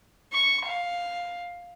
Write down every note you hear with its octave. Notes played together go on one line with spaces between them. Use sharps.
C#6
F5